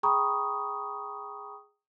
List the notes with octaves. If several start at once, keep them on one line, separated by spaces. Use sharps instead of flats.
G#4 G5 A#5 B5 C#6 D#6